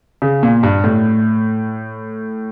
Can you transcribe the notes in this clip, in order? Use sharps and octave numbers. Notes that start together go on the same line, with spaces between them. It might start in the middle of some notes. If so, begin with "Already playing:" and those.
C#3
A#2
G2
A2